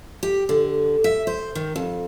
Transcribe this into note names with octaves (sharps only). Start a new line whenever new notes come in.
G4
D3
E5
C5
D#3
F2